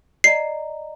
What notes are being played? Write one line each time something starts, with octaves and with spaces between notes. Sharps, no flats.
D5 D#5 A#5 C7